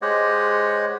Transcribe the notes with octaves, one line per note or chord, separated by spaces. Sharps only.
G#3 G4 C5 C#5 D#5 F#5